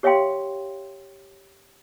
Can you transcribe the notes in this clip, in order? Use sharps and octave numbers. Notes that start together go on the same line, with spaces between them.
G4 C#5 E5 F5 G5 C6